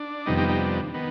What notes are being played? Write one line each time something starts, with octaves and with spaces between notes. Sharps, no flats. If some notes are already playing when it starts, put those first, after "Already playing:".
Already playing: D4
F2 C3 D#3 G3 B3 D#4
D#4 G4
D#4 G4
D4
D#3 B3